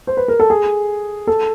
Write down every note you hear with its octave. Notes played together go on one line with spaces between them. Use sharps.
C5
B4
A#4
A4
G#4
A4